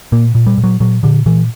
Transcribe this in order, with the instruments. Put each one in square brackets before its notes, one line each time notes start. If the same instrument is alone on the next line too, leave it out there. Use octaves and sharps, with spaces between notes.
[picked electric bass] A#2 A#3
A#2
G3
A#2
F#3
A#2 F#3
A#2 D3
A#2 E3